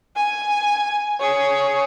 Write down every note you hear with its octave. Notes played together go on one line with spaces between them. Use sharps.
G#5
G#4 C#5